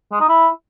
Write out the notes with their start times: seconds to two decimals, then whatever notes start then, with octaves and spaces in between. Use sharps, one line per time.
0.12 G#3
0.20 D#4
0.29 E4